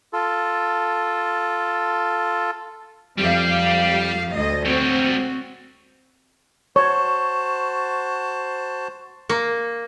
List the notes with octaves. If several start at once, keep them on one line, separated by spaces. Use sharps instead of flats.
F4 A4
F2 G3 G4 F5
D2 D#5
G3 C4 F#4 C#5
F#4 C5 C#5 A5 C#6
A#3